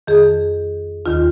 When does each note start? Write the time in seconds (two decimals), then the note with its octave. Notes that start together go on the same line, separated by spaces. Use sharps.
0.07 F2 D#3 G#4
1.06 D#2 D#3 F4